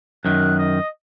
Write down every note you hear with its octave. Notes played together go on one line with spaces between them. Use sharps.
F#2 D#3 F#6
D#5